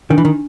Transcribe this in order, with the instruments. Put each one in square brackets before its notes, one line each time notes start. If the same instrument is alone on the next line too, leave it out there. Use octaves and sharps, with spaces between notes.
[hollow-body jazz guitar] D#3 [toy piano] D4
[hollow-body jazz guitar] E3
D#3